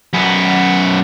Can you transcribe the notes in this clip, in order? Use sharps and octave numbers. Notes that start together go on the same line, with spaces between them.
F#2 B3